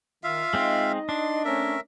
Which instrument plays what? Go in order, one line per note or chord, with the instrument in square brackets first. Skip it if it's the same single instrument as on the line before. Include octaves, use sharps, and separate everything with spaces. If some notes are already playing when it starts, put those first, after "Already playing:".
[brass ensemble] D#3 [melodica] F4 E5 F5
[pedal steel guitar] G#3 C4 [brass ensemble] D#4 D#5
[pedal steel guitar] D4 [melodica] C6
[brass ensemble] A3 C4 C#4 [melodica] A#4 E5